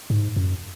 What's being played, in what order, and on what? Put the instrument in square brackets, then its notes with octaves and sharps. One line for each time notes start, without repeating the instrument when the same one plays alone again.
[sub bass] G#2
F#2